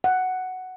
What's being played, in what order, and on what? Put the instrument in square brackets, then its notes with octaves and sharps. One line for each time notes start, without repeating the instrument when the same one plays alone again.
[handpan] F#5